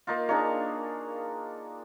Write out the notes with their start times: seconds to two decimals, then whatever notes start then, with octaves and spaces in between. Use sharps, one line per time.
0.07 A#3 D#4 F4
0.29 A#3 D4 D#4 G#4 C#5